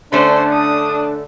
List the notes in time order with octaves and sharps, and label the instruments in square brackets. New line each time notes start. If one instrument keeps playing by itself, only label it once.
[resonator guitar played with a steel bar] D3 A3 C#4 [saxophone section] D4 [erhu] C5
[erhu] D#6